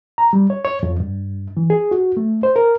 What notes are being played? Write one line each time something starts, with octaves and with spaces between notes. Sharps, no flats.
A#5
G3
C#5
C#5
F2
G2
E3
G#4
F#4
A3
C5
A#4